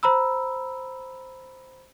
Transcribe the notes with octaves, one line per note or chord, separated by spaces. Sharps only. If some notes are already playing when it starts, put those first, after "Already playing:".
C5 A#5 B5 E6